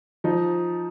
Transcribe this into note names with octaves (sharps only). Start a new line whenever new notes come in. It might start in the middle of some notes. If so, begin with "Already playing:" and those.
F3 D#4